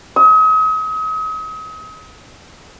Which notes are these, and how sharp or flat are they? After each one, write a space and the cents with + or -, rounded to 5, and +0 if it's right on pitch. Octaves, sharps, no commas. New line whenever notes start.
D#6 +40